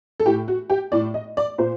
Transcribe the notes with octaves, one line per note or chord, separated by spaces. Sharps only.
A4
A2 G4
F#4
G4
A2 D5
D#5
D5
A#2 C5